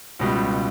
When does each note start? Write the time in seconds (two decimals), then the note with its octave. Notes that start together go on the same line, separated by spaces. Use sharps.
0.19 C#2 B2 G3